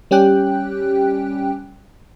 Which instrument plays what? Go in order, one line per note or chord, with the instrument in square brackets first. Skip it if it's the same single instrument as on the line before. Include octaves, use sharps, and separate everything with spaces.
[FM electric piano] G3 C#4 G4 G5 F#6